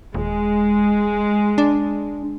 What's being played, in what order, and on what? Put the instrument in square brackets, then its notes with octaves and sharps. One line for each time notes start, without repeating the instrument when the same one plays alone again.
[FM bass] D#1 [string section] G#3
[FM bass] D4